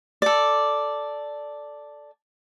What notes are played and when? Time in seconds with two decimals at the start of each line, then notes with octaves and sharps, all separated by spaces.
0.22 A4 D5